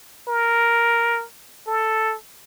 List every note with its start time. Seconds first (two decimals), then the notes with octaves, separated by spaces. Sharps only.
0.28 A#4
1.67 A4